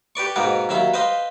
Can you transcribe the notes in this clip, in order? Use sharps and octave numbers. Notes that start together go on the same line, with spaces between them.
G4 B4 D5 C#6
G#2 B2 A#3 B3 B4 D6
D#2 F#3 E5 F5 B5
B4 C5 D#5 F5 B5